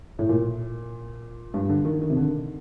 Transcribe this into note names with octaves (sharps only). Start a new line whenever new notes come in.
A2
A#2
G2
D3
D#3
D#3
C3
D3